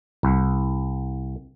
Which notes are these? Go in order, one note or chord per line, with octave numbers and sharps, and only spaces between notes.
C2